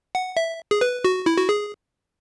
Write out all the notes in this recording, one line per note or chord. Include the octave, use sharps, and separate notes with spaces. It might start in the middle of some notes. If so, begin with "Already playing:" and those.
F#5
E5
G#4
B4
F#4
E4
F#4
G#4